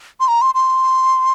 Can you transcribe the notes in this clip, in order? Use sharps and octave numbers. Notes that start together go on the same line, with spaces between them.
C6
A#5
C6
C6